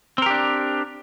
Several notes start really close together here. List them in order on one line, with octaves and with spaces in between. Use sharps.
C4 A#4 G4 D4